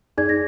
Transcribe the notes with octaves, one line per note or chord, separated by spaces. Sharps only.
D#4 G#4 D5 G#6
A#6